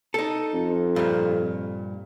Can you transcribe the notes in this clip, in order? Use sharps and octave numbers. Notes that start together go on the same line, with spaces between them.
D#4 A4
F2
G2 A#2